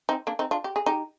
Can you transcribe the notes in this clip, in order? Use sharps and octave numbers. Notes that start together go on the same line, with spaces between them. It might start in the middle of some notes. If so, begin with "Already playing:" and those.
C4 D#4
A#3 D4
C4 D#4
D4 F4
G4
G#4
D#4 G4